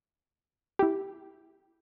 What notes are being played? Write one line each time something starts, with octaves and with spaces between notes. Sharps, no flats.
E4 G4